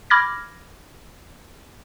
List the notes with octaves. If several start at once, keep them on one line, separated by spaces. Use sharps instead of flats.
B5 D6 F6 G#6 A#6